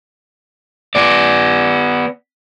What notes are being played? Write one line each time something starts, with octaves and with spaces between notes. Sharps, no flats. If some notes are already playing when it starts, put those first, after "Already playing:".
B3 D5